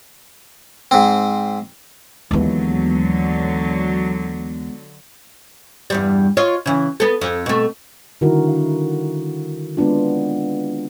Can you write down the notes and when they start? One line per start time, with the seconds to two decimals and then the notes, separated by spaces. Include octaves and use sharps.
0.91 G#2 C4
2.31 D#2 D3 E3 F#3 G#3 B3
5.90 E2 G2 G3
6.37 F4 C#5 D#5
6.66 C#3 E3
7.00 B3 A4
7.21 F2
7.46 B2 A3
8.21 D3 D#3 G3 E4 F#4 A#4
8.48 F5
9.77 G#3 B3 C4 D4 F4